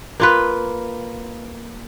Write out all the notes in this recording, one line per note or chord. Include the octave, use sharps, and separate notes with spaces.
A#3 F4 B4